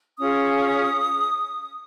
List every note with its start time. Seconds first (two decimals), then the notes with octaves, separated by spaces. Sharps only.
0.18 C#4 F4 G#4 D#6